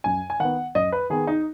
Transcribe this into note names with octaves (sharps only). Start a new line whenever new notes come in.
F#2 G#5
G#5
D#3 B3 F#5
F#2 D#5
B4
D#3 B3 G#4
D#4